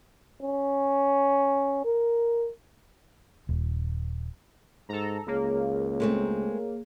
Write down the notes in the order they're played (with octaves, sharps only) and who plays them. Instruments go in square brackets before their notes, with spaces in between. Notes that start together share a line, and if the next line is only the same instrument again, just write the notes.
[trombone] C#4
A#4
[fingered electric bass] D#1
[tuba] G#2 [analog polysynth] A4 A#5
[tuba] C#2 [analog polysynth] A#3 [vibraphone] G#4 C#5
[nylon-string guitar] G#3 A3 C4